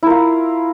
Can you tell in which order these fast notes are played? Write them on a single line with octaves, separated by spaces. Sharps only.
E4 A#4 F4